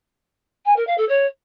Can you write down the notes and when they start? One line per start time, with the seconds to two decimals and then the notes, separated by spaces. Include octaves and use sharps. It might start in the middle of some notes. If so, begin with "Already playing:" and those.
0.65 G#5
0.76 A#4
0.87 F5
0.98 A4
1.08 C#5